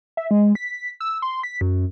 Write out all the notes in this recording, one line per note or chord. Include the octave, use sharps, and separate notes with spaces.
E5
G#3
B6
E6
C6
B6
F#2